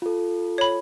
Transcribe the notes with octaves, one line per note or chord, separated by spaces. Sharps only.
F4 A4
C#5 B5